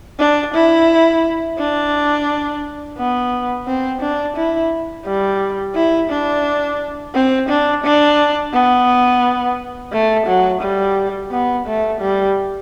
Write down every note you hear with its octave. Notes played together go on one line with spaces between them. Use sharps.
D4
E4
D4
B3
C4
D4
E4
G3
E4
D4
C4
D4
D4
B3
A3
F#3
G3
B3
A3
G3